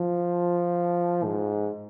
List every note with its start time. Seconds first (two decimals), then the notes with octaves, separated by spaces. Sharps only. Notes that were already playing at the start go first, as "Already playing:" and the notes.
Already playing: F3
1.24 G#2